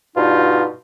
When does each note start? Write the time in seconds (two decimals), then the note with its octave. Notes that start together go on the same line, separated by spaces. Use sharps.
0.16 G2 B2 D#4 F4